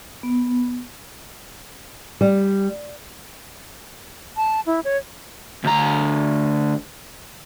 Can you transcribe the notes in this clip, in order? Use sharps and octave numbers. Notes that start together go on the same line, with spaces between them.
B3
G3
A5
E4
C#5
D2 A#5